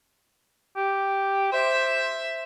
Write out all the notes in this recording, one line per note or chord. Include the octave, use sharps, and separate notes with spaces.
G4
C5 E5